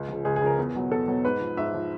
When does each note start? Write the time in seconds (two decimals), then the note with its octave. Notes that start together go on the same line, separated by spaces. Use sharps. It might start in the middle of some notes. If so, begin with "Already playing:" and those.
Already playing: C#2
0.08 C#3 F3
0.25 C#2 G#4
0.36 G#4
0.42 C#3 F3 A#4
0.58 E2
0.74 B2 F#3
0.91 E2 A4
1.08 B2 F#3
1.24 G#2 B4
1.40 F3
1.57 G#2 E5
1.74 F3